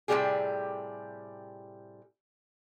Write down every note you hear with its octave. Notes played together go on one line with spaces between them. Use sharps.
A2 C3 D#3 G3 G4 G#4